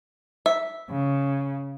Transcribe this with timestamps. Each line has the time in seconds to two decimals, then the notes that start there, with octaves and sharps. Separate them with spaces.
0.46 E5
0.90 C#3